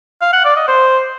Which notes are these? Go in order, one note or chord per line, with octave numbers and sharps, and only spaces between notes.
F5
F#5
D5
D#5
C5